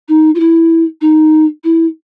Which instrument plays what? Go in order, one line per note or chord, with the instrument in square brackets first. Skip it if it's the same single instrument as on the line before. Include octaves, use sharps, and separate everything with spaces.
[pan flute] D#4
F4
E4
D#4
E4